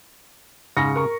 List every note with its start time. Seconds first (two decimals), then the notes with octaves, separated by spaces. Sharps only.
0.77 G#2 C#3 A#6 C#7
0.96 A#4 C#6